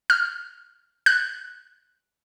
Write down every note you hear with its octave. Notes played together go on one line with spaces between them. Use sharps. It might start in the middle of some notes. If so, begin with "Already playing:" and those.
F6
F#6